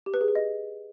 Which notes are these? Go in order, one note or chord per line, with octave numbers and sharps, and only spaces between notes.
G4
B4
G#4
B4
D#5